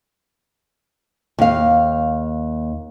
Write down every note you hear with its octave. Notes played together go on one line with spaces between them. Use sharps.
D#2 F5